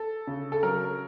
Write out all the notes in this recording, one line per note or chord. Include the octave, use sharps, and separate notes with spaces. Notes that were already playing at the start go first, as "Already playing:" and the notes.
Already playing: A4
C#3
A4
F#3 A#4